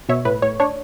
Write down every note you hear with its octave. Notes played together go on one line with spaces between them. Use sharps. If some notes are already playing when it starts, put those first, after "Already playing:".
B2 C#5 E5
A2 B4
A2 C#5
D4 C#5